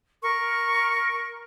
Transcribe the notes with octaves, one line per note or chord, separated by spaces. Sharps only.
A#4 C#6